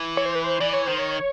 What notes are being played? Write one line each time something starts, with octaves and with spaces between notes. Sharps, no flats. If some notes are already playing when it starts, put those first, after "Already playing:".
Already playing: E3
C#5
C5
B4
C5
E3 D5
C#5
D#3 C5
C#5